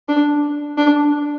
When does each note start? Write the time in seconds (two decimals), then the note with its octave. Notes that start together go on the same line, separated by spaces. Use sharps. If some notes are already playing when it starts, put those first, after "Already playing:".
0.09 D4
0.78 D4